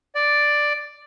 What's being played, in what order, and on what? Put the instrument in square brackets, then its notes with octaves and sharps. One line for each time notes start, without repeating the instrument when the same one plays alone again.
[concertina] D5